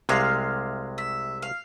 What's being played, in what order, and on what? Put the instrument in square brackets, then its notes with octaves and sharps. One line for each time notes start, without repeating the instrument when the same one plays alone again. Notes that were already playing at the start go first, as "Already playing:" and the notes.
[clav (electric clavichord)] C2 C3 G#3 [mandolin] F5
[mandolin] E5
F5